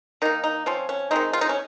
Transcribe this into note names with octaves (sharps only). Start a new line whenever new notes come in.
D#3 A#3 D#4
D#4
F3 C4 C#4
C#4
D#3 G#3 C4 D#4
F4
D#4
C#4